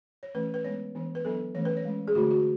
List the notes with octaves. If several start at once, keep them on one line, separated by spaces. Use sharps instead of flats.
C#5
E3 A3 C#4 B4
B4
G#3 B3 D4 C#5
E3 B3 D4
B4
F#3 B3 D4 A4
E3 A3 C#4 C#5
B4
C#5
G#3 C#4
G#4
D3 A3 D4 F#4
F#4